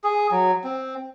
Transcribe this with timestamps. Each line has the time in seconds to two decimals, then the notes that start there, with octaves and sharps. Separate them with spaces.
0.04 G#4
0.31 F#3
0.64 C4